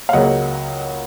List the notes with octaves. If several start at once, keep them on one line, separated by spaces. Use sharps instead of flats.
F5
C#2 C#3 F#3 A#3 D#5 F#5